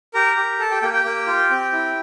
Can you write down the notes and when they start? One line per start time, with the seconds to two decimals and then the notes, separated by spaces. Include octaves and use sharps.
0.14 G4 A#4 A#5
0.36 G4
0.59 A4 A5
0.71 G4 G5
0.82 A#3 G4 G5
0.93 G4 G5
1.05 A#3
1.27 F4
1.50 C4
1.72 E4